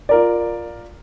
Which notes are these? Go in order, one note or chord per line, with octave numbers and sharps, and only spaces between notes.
F4 A#4 D5